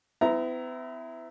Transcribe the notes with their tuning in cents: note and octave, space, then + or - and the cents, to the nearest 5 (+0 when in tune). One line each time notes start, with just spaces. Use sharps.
B3 +45 E4 +0 A#5 +0